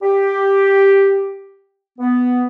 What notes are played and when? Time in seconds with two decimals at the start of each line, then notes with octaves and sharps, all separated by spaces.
0.02 G4
1.98 B3